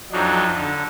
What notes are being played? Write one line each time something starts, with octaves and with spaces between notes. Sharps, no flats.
F2 F#3 D4 D#4
D3